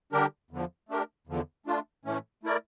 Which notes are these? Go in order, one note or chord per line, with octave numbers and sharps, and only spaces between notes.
D3 G3 D4 G4 A#4
E2 D3 F3
A3 D4 G4 A#4
E2 D3 F3
A3 D4 F4
A2 E3 A3 C#4
A3 E4 A#4 D5